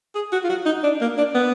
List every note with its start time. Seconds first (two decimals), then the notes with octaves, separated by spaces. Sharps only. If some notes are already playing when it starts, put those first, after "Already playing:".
0.15 G#4
0.32 F#4
0.44 F4
0.49 F#4
0.66 D#4
0.83 D4
1.01 A#3
1.18 D4
1.34 B3